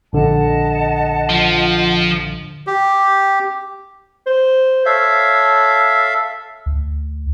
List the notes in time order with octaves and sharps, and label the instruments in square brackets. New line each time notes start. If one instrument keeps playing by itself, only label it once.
[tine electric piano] A#1 D3 [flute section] D#5 F#5 A5
[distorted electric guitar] F3
[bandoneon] G4
[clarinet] C5
[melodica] A4 E5 F5 [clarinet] C#5
[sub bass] D2